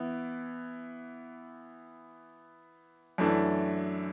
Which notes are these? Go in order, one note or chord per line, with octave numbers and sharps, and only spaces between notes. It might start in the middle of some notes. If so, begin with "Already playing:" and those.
Already playing: E3 B3 E4
F#2 E3 A3 D4